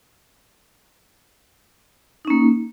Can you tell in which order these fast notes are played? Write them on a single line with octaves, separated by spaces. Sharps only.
D#4 C#4 A#3